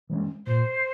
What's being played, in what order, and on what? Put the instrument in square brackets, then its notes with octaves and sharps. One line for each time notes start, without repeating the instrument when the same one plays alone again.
[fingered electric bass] E3 G#3 C#4
[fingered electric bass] A#2 [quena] C5